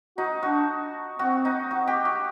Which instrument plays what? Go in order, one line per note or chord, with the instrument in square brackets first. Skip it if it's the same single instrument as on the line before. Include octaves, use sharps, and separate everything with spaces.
[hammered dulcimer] D#4 [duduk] F#4
[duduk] D4 [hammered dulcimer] F#4
[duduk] C4 [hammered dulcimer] F#4
[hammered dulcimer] D#4
F#4
G4
F#4